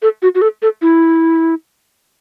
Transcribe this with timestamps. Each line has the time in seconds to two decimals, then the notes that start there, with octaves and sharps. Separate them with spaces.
0.02 A4
0.22 F#4
0.35 F#4
0.42 A4
0.62 A4
0.82 E4